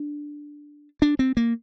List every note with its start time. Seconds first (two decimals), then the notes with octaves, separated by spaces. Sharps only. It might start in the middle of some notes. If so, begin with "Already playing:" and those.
Already playing: D4
1.02 D4
1.19 C4
1.37 A#3